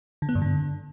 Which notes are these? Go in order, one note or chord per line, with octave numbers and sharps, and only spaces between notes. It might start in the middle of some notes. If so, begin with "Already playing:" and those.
D3
B3
G2
D3